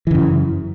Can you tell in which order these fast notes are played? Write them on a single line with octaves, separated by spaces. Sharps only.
E3 C#3 F#2